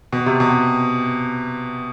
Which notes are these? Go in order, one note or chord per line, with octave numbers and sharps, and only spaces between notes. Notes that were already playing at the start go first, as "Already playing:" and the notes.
B2
C3
B2